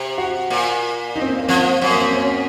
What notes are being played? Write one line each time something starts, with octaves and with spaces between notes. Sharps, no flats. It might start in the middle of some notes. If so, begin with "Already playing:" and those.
Already playing: C3
F#4
A#2
D#4
C4
A#3
A#3
F3 C4
F#2
A#3
C4
C#4